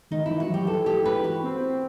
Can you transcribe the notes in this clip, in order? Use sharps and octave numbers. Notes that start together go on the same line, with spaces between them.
D#3 D#4
E3 E4
F#4
F#3
G4
F#3
E3 A4
G4
B4
F#4
C4